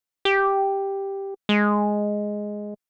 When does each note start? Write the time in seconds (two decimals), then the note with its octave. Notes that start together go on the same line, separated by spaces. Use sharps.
0.25 G4
1.49 G#3